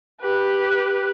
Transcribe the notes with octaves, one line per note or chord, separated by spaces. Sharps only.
G4 B4